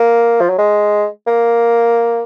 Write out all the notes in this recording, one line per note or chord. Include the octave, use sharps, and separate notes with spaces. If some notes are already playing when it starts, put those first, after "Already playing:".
Already playing: A#3
F3
F#3
G#3
A#3